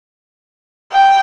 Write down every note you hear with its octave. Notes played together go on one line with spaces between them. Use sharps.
G5